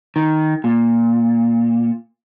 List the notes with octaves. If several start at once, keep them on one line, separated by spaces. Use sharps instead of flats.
D#3
A#2